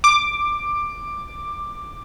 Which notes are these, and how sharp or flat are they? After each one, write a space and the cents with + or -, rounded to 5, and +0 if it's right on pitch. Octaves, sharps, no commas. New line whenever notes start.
D6 +10